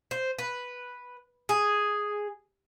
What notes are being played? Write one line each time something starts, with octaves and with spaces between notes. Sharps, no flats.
C5
B4
G#4